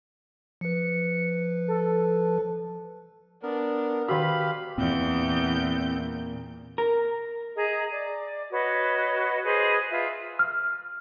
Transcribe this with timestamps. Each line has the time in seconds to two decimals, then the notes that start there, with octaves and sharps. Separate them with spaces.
0.61 F3 B4 C#7
1.68 A4
3.43 B3 D4 A#4
4.09 D#3 F#4 G4 B4 F5 B5
4.78 E2 A#2 C4 G6
6.78 A#4
7.57 G#4 D#5 A#5
7.91 D5
8.51 F#4 B4 C#5 D#5
9.45 G#4 B4 C5 D#5
9.90 F4 B4 E5
10.39 F6